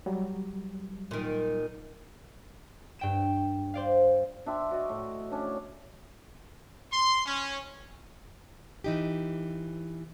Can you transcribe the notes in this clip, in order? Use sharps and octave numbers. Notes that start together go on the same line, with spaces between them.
F#3 G3
A#2 D#3
G2 G5 E7
C5 D5 F5
D4 E5 G5 C6
F#4 D5 D#5
A2
C#4 D4
C6
C#4
E3 D#4 G4